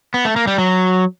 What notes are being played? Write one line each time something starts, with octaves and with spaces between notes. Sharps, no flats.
B3
A3
A#3
G3
F#3